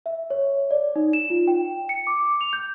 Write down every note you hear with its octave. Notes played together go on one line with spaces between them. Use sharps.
E5
C#5
D5
D#4
E7
F4
G5
C#7
D6
F7
G6